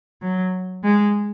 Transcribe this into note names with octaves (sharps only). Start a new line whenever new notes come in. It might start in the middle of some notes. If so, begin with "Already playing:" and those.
F#3
G#3